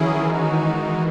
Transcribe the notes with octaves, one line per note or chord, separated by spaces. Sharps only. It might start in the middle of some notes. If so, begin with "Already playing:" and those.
Already playing: D#3 E3 F#3 C#4 E4 G#4
G#3 D#4 F#4